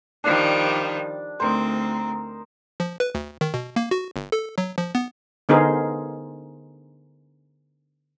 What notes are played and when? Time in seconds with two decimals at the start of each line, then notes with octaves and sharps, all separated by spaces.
0.24 D#3 F3 G3 D4
1.40 D2 C4 D#4 A#4 C5
2.80 F3
3.00 B4
3.15 D2
3.41 D#3
3.54 B2
3.76 A#3
3.91 F#4
4.16 G1
4.32 A4
4.58 F#3
4.78 F3
4.95 B3
5.49 D3 B3 D#4 G#4 A#4 C5